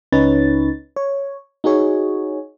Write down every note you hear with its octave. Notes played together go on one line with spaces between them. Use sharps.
C#2 C#4 D#4 B4 C#5 A6
C#5
D#4 F#4 G#4 C#5